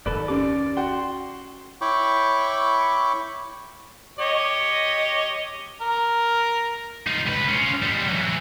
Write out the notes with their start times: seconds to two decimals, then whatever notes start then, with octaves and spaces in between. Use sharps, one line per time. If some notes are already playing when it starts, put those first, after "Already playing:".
0.06 F#1 D#2 A4 B4 D5
0.28 C#4 G4 D5 D6
0.77 F#4 G5 C6
1.81 E4 C#5 G5 B5 C#6 D6
4.19 G4 C#5 D#5
5.81 A#4
7.07 D#4 F4
7.26 C#2 B4
7.48 C#4 F4
7.82 G3 G#3
8.07 E3 F#3